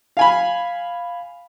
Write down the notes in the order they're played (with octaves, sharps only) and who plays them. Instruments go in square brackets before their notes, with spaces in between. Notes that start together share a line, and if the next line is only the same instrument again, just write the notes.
[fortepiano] F5 G#5 B5